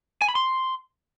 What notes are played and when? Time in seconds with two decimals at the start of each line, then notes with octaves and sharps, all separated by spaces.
0.22 G#5
0.28 B5
0.35 C6